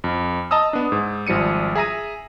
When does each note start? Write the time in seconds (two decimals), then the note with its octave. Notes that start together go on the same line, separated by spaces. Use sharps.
0.04 F2
0.51 D#5 A5 A#5 D#6 E6
0.73 B3 D4
0.92 G#2
1.27 G#1 F3 G3 C#7 D#7
1.75 G#4 E5 A#5 A#6 D#7